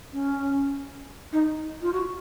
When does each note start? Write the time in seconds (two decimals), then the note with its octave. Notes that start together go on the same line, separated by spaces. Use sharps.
0.13 C#4
1.32 D#4
1.82 F4
1.92 F#4